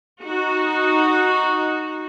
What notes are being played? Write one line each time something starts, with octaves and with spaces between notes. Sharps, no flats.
D#4 F#4